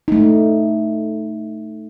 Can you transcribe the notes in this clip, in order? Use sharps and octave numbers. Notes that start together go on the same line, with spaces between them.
A3 D#4